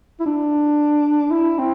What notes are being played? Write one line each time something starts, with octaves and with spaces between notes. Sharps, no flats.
E4
D4
E4
C4